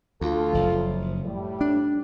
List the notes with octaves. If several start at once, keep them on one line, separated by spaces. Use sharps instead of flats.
D2 F4 A4
F#1 F3
A2 G3
D4